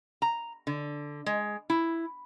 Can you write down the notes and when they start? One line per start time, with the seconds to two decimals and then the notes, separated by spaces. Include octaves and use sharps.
0.22 A#5
0.67 D3
1.26 G#3
1.70 E4